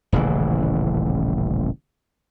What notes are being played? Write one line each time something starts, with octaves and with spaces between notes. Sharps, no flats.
D#1 A1 C#3 E3